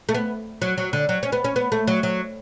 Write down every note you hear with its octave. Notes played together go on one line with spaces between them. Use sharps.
A3
B3
F#3
F#3
D3
F#3
C#4
B3
C#4
B3
A3
F#3
F#3